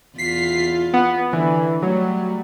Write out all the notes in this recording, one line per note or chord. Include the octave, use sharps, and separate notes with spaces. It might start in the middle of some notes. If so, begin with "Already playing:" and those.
E2 F4 B6 C7
B3
D3 E3
F#3 G3 A3